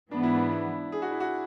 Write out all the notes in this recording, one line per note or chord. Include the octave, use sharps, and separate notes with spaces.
G#2 E3 B3 D4
E4
D4
E4
G#4
F#4
E4
F#4